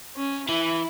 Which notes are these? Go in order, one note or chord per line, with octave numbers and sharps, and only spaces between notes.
C#4
E3 E4